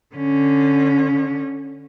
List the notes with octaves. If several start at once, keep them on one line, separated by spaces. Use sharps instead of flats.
D3 C#4